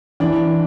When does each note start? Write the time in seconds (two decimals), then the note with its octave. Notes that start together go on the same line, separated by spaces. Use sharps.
0.20 E3 D4